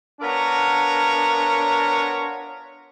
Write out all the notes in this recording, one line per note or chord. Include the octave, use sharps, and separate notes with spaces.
B3 D4 F4 A#4 C#5 A#5